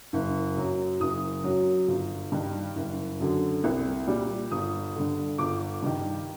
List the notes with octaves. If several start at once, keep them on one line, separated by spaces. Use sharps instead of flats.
F#1
F#2 F#3
F#1 D#6
F#2 F#3
G1
G2 D#3
F#1
F#2 D3
C2
A#2 G3
G1 D#6
G2 D3
G1 D6
G2 D#3